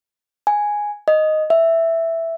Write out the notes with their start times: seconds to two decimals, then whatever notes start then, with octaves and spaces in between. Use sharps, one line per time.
0.47 G#5
1.08 D#5
1.50 E5